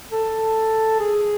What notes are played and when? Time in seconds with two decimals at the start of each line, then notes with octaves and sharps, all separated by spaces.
0.12 A4
1.00 G#4